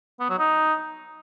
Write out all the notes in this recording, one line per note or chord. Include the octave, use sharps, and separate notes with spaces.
B3
F#3
D#4